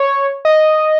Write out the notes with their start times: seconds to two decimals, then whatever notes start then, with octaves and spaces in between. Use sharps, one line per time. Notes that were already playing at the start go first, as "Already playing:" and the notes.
Already playing: C#5
0.45 D#5